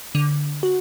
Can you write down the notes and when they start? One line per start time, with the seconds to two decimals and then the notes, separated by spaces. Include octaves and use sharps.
0.15 D3
0.63 F#4